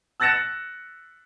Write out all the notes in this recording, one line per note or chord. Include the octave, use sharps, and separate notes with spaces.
E6 F#6 A6 A#6 C#7 E7